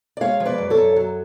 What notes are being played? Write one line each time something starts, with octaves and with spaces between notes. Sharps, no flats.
D5
G#3 C#5 F5
F3
B4 D5
F#2
A4 C#5
F#2
F#3